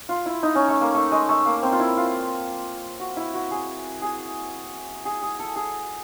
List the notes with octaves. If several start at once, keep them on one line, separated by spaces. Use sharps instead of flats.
F4
E4
D#4
C#4
A3
A#3
A3
G#3
A3
A#3
C4
F4
E4
F4
F#4
E4
F#4
G#4
G#4
G#4
G#4
A4
G#4